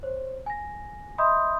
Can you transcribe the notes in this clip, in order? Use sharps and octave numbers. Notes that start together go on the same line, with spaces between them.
C5 C#5
G#5 A#6
D#5 E5 B5 C6 D#6 G6